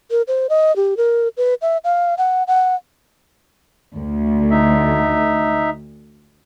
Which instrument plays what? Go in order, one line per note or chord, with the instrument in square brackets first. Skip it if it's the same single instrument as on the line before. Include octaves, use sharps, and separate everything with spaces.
[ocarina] A#4
C5
D#5
G4
A#4
B4
E5
F5
F#5
F#5
[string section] D2
[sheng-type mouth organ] D#4 E5